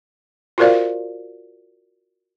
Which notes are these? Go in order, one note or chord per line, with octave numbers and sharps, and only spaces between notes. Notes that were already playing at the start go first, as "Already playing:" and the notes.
F4 F#4 A#4 C5 D5 F5